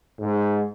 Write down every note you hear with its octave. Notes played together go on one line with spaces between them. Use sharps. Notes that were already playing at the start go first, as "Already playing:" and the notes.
G#2